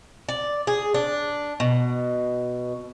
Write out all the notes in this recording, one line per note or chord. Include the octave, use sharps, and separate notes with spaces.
D5
G#4
D4
B2